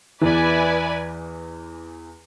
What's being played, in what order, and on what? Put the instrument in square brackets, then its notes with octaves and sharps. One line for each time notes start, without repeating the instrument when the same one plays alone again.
[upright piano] E2 E3 [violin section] E4 B4 D5 G#5